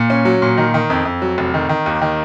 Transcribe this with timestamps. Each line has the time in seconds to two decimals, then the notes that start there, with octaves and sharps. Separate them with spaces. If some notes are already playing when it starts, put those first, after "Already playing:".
Already playing: A#2
0.10 C#4
0.25 F#3
0.42 A#2
0.57 D#3
0.74 D#3
0.90 F2
1.05 F2
1.22 F#3
1.38 F1
1.54 D#3
1.69 D#3
1.86 D#2
2.02 D#3